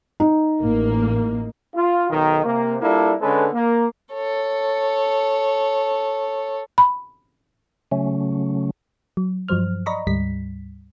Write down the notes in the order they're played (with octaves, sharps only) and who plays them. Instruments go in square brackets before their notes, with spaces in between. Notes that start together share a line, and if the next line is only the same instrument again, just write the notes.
[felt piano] D#4
[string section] A1 A#3
[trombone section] F4
B1 D#3
C3 A#3
G3 A#3 D4 E4 F4 A4
D3 G#3 C#4 A4 B4
A#3
[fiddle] A4 C#5
[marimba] B5
[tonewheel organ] C#3 F#3 A3 C#4
[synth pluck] F#3
G2 F3 F#3 C5 F6
D5 D#5 A#5 B5 C#6
D2 G#2 G3 B6